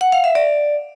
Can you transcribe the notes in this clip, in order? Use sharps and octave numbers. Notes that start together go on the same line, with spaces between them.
F#5
F5
E5
D5